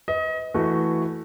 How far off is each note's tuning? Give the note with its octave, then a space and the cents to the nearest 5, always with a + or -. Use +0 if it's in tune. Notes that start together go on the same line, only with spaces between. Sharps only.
B4 +25 D#5 +30
E3 +0 A3 +0 F#4 +0